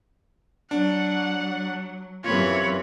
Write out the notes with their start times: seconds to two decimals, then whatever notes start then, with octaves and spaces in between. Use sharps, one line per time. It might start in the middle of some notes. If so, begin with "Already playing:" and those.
0.71 F#3 D4 F#5
2.24 F#2 C3 E3 F4 C#5 B5